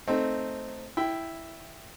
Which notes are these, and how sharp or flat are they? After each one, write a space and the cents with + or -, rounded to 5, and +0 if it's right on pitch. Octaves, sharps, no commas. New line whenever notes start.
A3 +0 C4 +0 D#4 -5
E4 +0 G5 +0